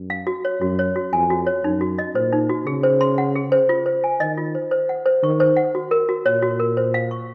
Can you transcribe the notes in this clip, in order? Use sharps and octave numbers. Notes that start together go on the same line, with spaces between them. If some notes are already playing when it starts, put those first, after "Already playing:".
Already playing: F#2
F5
F#4
C#5
F#2 F#4
C#5
F#4
F2 G#5
F#4
C#5
F#2 D#4
F#4
D#5
A#2 C5
D#4
F#4
C#3 G#4
C5
C6
F#5
G#4
C5
F4
C5
G#5
D#3 D#5
F4
C5
C5
F#5
C5
D#3 C#6
C5
F#5
F#4
A#4
F#4
A#2 C#5
F#4
A#4
C5
F5
C#6